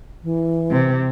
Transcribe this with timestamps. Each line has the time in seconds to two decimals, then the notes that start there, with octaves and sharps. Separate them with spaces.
0.23 E3
0.71 C3